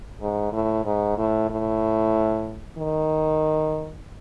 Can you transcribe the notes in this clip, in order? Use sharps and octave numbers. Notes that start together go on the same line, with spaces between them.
G#2
A2
G#2
A2
A2
D#3